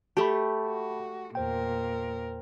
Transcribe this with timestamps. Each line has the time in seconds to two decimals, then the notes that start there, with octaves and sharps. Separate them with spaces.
0.17 A3 G4 A5 B5
0.68 F#4
1.35 E2 A#2 A#4 C5 G5